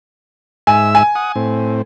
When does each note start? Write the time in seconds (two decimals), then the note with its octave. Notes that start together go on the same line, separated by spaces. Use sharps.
0.67 G#2 E5 G#5 E6
0.95 G#5
1.15 F#5 D#6
1.36 A2 C4